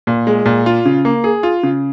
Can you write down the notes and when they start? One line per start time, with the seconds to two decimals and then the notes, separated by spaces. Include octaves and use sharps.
0.07 A#2
0.27 G#3
0.46 A#2
0.66 F4
0.85 C#3
1.05 A#3
1.24 G#4
1.43 F4
1.63 C#3